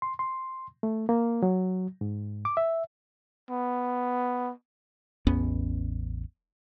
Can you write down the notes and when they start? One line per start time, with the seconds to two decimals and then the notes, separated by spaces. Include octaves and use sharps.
0.02 C6
0.19 C6
0.83 A3
1.09 A#3
1.43 F#3
2.01 G#2
2.45 D6
2.57 E5
3.50 B3
5.27 A1 E2 B3 C#4